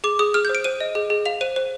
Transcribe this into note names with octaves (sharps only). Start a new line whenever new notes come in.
G#4 D6
G#4 D#6
G#4 F6
G6
C5
D7
C5 D#7
D#5
G#4
G#4
F5 F7
C5 D#7
C5